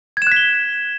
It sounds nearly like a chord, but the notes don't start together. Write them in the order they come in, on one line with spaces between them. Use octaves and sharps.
G#6 E7 F#6 B6 G7